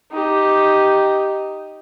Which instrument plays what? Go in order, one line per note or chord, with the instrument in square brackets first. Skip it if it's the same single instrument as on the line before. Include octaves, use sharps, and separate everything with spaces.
[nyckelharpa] D#4 G4